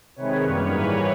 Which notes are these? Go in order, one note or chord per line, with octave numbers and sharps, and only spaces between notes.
C3 D#3 G#3 B4 C#5
F#2 D#3 G3 A#3
G#2 E3 G3 A#3 B4 C#5